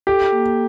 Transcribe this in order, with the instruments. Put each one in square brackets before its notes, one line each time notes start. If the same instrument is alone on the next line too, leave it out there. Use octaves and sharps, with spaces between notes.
[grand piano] G4 [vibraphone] A4
[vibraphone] A#3